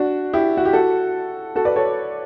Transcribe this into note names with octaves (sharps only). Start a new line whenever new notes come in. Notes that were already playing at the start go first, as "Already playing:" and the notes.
Already playing: D4 F#4
E4 G4
F#4
G4
F#4 A4
F#4 A4
B4 D5
A4 C#5